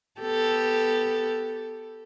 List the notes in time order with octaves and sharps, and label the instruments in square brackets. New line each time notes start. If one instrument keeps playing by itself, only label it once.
[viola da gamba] B3 G4 A4